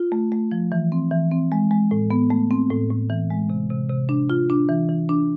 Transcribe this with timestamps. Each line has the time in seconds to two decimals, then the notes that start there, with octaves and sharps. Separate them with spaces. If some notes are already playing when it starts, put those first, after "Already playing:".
Already playing: F4
0.12 A3
0.32 A3
0.52 F3
0.72 E3
0.92 C4
1.12 E3
1.31 C4
1.52 G#3
1.71 G#3
1.91 A2
2.11 B3
2.30 A3
2.51 C4
2.70 A2
2.91 A2
3.10 E3
3.30 G#3
3.50 C3
3.70 C3
3.90 C3
4.09 D4
4.30 F4
4.50 D4
4.69 E3
4.89 E3
5.09 D4